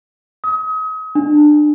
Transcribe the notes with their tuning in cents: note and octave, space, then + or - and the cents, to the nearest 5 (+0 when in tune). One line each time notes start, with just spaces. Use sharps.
D#6 +35
D4 +25